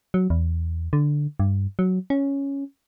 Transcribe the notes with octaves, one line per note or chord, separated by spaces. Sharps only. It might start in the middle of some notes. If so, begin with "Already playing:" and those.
F#3
E2
D3
G2
F#3
C#4